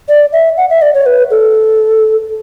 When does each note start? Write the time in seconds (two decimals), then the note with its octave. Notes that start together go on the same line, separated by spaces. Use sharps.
0.09 D5
0.33 E5
0.57 F#5
0.70 E5
0.82 D5
0.94 C#5
1.06 B4
1.31 A4